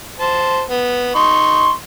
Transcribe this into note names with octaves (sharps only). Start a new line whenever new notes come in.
C5 A5
B3
D#4 C6 C#6